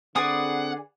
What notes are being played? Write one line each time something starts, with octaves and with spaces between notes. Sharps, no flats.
D3 C4 G#4 B4 D5 F#5 D#6